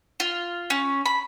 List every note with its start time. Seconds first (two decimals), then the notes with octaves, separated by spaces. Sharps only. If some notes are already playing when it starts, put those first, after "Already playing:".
0.20 F4
0.70 C#4
1.06 B5